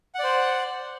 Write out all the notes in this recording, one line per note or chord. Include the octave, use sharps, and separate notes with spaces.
C5 D5 F#5